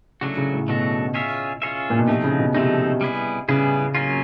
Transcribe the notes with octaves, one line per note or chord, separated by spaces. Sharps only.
C#3 F#3 A3 D4 F#4
C#3
A2
B2 F#3 A3 D4 F#4
C#4 F4 G#4 C#5 E5
C#4 F4 G#4 C#5 E5
A#2
B2
C3 F3 A3 C4 D#4
C#3
B2
C3 F3 A3 C4 D#4
G3 B3 E4 G#4
C#3 G3 B3 E4 G#4
F#3 A#3 C#4 F4